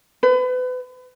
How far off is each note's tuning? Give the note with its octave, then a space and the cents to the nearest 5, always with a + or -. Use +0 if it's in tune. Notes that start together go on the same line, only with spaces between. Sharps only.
B4 +35